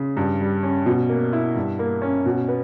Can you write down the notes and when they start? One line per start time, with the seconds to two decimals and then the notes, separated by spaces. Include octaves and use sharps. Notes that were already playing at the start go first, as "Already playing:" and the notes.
Already playing: C#3
0.17 G2
0.40 G3
0.63 C#4
0.86 B2
1.09 A#3
1.33 E4
1.56 G2
1.79 A#3
2.02 C#4
2.26 B2
2.48 B3